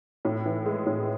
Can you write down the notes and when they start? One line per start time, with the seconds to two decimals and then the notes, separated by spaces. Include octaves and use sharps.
0.25 A2
0.46 E3
0.66 G#3
0.86 A2